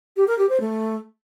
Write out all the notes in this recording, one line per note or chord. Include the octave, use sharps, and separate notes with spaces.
G4
A#4
G4
C5
A3